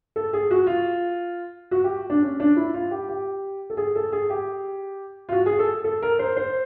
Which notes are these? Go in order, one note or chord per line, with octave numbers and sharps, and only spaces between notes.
A4
G#4
F#4
F4
F#4
G4
D4
C#4
D4
E4
F4
G4
G4
A4
G#4
A4
G#4
G4
F4
F#4
G#4
A4
A4
A#4
C5
C5